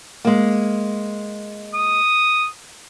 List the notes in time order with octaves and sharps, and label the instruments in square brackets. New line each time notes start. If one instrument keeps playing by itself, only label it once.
[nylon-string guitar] G#3 A#3
[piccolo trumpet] D#6